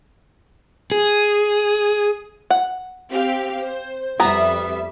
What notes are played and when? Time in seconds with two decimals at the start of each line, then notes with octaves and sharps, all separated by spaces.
0.92 G#4
2.50 F#5
3.11 C4 G4 F5
3.63 C5
4.20 F2 G3 B3 E5 A#5